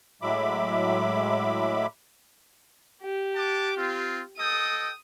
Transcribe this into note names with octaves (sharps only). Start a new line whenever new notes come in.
A2 F#3 G#3 E5 B5 D6
G4
F#5 A5 D6
C4 F4
A4 D#5 G5 D#6